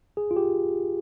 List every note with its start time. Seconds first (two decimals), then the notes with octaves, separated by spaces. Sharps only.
0.17 G#4
0.31 F4
0.36 G4